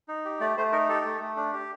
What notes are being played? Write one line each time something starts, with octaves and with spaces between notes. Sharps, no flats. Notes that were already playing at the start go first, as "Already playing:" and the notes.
D#4
G4
A3 D5
A3 C5
D#4 A#4
G4 A4
A3
A3
D4
G4